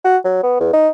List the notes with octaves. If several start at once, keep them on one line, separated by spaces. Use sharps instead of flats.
F#4
F#3
B3
E2
D#4